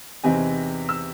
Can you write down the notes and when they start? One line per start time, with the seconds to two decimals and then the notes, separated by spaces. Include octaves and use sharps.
0.24 E2 C3 E3 C4 D#4 G#5
0.89 E6